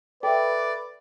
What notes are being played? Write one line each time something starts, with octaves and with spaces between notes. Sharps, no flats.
A4 B4 D5 E5 G5